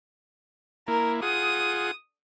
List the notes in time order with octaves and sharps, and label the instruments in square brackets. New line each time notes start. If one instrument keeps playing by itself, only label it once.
[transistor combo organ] A#3 E4 [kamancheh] A#4
[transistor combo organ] F4 G#4 F#5 [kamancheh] D#6